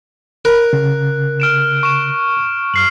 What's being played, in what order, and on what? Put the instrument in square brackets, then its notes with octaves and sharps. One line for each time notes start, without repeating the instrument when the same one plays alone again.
[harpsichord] A#4 [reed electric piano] B5 [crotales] F#6
[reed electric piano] C#3
[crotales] F6 D7 E7
C#6 E7
[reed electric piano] F#2 [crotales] F6 C7 F#7